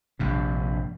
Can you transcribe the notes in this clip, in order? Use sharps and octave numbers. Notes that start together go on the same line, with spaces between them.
A#1 G2 C3